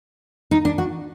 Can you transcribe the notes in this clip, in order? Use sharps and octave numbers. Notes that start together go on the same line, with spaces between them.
D#4
D4
F#4